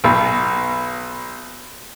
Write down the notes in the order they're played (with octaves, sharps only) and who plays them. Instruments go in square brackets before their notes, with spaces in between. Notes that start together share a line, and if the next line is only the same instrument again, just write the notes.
[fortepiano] B1 B2